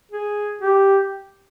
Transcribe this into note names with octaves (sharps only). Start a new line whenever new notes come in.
G#4
G4